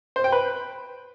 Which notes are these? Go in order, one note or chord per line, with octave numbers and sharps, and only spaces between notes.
C5
G5
B4